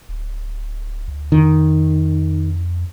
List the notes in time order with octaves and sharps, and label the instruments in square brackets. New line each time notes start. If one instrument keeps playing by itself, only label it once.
[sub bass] D1
D2
[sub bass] F2 [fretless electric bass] D#3